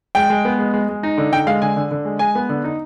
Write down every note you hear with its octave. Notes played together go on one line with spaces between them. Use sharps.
G#3 G5
G#3
B3
G#3
G#3
G#3
D#4
D3
D3 G5
G#3 F5
D3 G#5
D3
D3
G#3
G#3 G#5
B3
D3
D#4